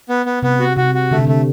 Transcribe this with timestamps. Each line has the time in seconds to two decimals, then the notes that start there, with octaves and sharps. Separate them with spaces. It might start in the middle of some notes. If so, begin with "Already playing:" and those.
0.09 B3
0.26 B3
0.43 C3 B3
0.60 F#4
0.76 C3 F#4
0.95 F#4
1.11 D3 A3
1.19 C3
1.27 D3 A3